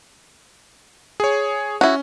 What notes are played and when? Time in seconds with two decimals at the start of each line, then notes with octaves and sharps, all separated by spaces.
1.20 G#4 C#5
1.81 C#4 E4 F#4